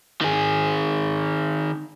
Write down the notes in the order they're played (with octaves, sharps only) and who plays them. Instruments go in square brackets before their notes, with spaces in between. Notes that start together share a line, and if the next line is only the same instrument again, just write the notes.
[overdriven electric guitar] D#3 G#4